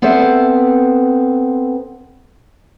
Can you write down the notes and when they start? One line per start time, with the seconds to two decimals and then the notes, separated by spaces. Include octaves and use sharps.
0.02 B3 C4 A4 B4 C5 E5